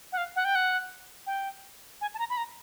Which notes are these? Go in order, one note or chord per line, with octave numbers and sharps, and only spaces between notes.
F#5
F5
F#5
G5
F#5
G5
G#5
A5
A#5
B5
A#5